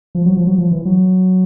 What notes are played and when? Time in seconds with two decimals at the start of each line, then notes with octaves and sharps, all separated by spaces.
0.15 F3
0.26 F#3
0.37 F3
0.47 F#3
0.58 F3
0.72 E3
0.85 F#3